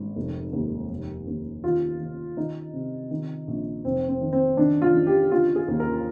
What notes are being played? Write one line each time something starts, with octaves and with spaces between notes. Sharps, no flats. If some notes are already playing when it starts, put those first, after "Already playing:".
Already playing: G#1
F1
D#2
F1
D#2
D#3 F4
D#3
D#3 D#4
C3
D#3
A#1
F1 C4
C4
D#3
C4
D#3 D4
F4
D#3
G4
D3 F4
G#4
D#2
A#4